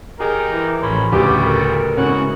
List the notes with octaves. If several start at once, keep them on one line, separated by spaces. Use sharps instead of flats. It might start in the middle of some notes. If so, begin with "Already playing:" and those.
D#4 G4 G#4 A#4
E3
A1 F3 C#4 B5 C6
D2 C#3 G3 B3 F#4 G4
A4 A#4
G#2 C#3 E3 B3 C#4 F#4 F#5